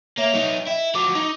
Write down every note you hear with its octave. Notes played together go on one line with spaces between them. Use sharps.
A#3 C#5 E5 F7
F#3 D#4
E4 D#5 G5
F3 F#3 D6
D#4